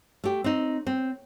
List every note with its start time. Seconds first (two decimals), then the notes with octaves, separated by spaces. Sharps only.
0.24 A3 G4
0.44 C4 D#4
0.87 C4